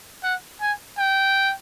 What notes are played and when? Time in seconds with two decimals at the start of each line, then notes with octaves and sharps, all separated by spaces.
0.23 F#5
0.61 G#5
0.98 G5